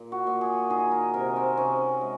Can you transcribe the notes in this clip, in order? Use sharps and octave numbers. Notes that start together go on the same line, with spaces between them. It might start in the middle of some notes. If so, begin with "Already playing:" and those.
Already playing: A#2
F#4
A#2
G#4
D#3 G#4
A#4
C3 A#4
C4
C3 C#4
G#3